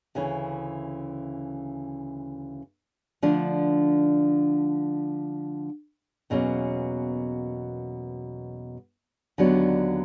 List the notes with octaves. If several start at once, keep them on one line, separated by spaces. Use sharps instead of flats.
D2 C#3 E3
D3 F3 A3 D4
E2 B2 F#3 A#3 C#4
D#2 D3 F#3 B3 D4